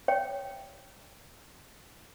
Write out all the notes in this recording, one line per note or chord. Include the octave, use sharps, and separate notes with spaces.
C#5 G5